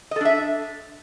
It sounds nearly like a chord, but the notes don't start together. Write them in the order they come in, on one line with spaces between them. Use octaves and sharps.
D#5 A4 D4 E5